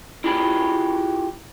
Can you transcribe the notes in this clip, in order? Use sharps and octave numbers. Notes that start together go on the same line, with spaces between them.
E4 F4 G4 G#4 A#5 B5